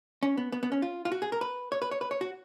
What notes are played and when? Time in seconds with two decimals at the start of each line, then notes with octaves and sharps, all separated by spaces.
0.23 C#4
0.37 B3
0.52 B3
0.63 B3
0.72 C#4
0.82 F4
1.05 F4
1.12 F#4
1.22 G#4
1.32 A#4
1.41 B4
1.72 C#5
1.82 B4
1.91 C#5
2.01 B4
2.11 C#5
2.21 F#4